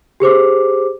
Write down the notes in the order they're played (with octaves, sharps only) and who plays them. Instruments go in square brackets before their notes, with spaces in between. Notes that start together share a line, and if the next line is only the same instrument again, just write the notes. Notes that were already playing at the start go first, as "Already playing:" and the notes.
[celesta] G4 G#4 C5 D6